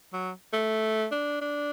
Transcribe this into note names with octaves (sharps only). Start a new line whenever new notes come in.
F#3
A3
D4
D4